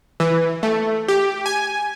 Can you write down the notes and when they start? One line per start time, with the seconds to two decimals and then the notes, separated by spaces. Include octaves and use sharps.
0.20 E3
0.63 A3
1.08 G4
1.46 G#5